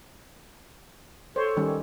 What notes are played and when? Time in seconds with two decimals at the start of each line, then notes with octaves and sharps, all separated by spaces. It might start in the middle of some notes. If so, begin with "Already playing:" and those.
1.36 A4 C5 C#5
1.57 D#3 G3 C#4